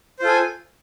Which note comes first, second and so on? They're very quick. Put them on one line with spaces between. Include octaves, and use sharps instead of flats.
C5 F4 A4 G#5